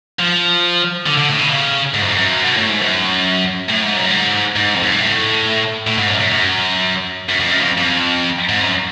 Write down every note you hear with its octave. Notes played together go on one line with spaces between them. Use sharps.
F3
D3
D3
A2
B2
C#3
G#2
F#2
F2
F#2
B2
A2
G#2
F#2
A2
G#2
F#2
G#2
G#2
F2
F#2
G#2
A2
A2
G#2
F#2
F#2
F#2
F#2
F2
F#2
F2
F2
G#2
F#2